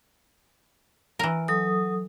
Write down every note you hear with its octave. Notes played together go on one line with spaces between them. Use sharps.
E3 A#4
F#3 A4 D#6